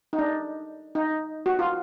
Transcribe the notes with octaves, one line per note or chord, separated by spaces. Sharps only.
D#4
D4
D#4
F#4
F4